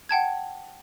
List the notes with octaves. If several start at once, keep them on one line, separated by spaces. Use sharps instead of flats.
F#5 G5 A5 G#6